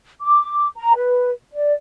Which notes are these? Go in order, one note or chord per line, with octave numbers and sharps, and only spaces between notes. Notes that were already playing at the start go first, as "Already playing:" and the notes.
D6
A#5
B4
D5